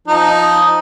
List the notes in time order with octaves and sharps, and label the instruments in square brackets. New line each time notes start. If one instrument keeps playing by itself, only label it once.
[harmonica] F3 D#4